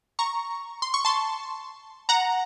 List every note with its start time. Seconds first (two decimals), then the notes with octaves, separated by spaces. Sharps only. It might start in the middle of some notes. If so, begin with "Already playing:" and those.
0.19 A#5 C#6
0.82 C6
0.94 C#6
1.05 A5 C6
2.09 F#5 A#5